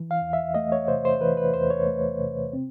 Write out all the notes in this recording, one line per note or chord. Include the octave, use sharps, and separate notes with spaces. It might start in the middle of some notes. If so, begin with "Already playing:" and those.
Already playing: E3
F5
E2
E5
A3 D#5
C#5
C3 C5
C5
E3 B4
B4
E2 C5
C#5
A3
C3
C4